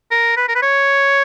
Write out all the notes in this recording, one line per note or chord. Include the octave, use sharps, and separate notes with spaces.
A#4
B4
A#4
B4
C#5